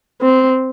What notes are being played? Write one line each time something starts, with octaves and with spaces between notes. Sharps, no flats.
C4